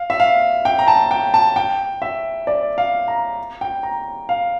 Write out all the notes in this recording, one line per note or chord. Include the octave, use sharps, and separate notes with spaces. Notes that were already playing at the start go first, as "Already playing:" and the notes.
Already playing: F5
E5
F5
G5
A#5
A5
G5
A5
G5
E5
D5
F5
A#5
G5
A#5
F5